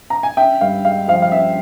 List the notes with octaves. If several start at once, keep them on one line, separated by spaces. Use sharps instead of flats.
A#5
G#5
C#4 E5 G5
G2 F5
G#3 F5
F3 F5
F5
C#4 E5